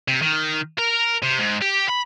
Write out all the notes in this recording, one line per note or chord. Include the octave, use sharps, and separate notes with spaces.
C3
D#3
A#4
C3
G#2
G4
B5